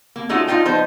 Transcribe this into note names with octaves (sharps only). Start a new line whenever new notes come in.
A#3
G#3 A3 C#4 D#4 F4 F#4
D4 D#4 F4 C5 G5
F3 B3 D#4 C5